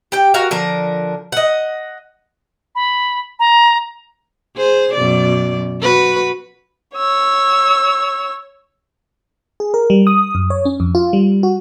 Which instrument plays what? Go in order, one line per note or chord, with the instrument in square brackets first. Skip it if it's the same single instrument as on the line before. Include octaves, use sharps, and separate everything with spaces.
[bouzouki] G4 G5
F#4 A#4 F5
D3 F3 A#4
D#5 F#5
[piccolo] B5
A#5
[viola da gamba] G#4 C5
F#2 B2 D5
F#4 B4
[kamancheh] C#5 E6
[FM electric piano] G#4
A#4
G3
D#6
F#2
C#5
C#4
F2
F4
G3
F#4